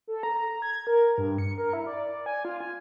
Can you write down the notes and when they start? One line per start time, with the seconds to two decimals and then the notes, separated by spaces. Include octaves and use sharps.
0.07 A4
0.23 A#5
0.62 G#6
0.87 A#4
1.18 G2
1.38 C#7
1.58 A#4
1.73 E4
1.87 D5
2.26 G#5
2.45 F4
2.60 G#5